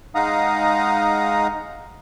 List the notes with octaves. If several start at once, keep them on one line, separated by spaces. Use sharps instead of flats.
G#3 D#4 F5 F#5 A#5 D#6